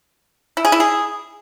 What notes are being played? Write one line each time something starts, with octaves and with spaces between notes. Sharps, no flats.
E4
G#4
E4
G#4